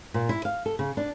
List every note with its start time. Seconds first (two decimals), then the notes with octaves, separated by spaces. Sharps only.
0.14 A#2
0.29 E4
0.45 F5
0.66 A4
0.79 C#3
0.97 D4